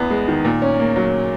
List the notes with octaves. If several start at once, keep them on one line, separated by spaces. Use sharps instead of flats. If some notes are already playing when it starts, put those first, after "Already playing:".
Already playing: E2 B3
G#3
D#3
A#2
C#4
A#3
F#3